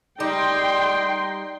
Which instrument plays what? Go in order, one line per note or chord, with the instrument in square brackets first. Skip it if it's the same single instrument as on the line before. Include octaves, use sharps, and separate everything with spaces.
[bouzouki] G3 [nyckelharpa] D#4 [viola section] G5 C6